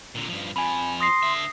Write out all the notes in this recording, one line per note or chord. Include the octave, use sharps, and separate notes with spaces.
A#2 D3
G2 F3
F2 F3 G#5 B5
C6 D#6 A#6 C7
D3 E5